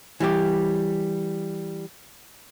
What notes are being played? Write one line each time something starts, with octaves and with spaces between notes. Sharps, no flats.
E3 G3 G4